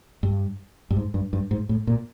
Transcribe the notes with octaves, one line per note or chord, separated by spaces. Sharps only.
G2
G2
G#2
G2
G2
G#2
A2
A#2